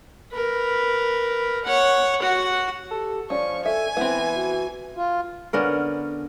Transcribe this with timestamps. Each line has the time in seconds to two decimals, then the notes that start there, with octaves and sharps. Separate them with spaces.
0.32 A#4 B4
1.65 C#5 F#5
2.22 F#4 F#5
2.91 G4 A4
3.30 F3 C#4 D5 C#6
3.66 A4 E5 G#5
3.97 E3 B3 C4 E4
4.35 F#4
4.97 F4
5.53 D3 B3 C#4 A#4